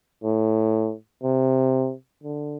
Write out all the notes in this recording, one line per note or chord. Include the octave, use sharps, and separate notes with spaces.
A2
C3
D3